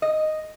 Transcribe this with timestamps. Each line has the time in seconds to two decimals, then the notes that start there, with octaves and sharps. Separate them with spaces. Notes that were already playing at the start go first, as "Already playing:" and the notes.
0.02 D#5